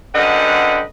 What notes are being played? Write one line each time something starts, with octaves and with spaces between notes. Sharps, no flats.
F#2 D3 B4 D#5 F#5 G5